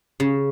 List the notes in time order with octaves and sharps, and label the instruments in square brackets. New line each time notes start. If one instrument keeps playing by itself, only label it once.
[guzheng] C#3